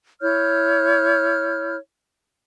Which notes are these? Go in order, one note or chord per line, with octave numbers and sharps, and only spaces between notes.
E4 C#5 F6 G6